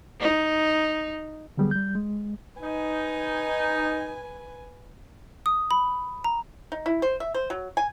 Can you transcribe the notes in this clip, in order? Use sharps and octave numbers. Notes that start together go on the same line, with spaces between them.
D#4
D3 F#3 G3 B3 G#4
G3 G6
G#3
D#4 B4 G#5
D#6
B5
A#5
D#4
E4
C5
E5
C5
F#3
G#5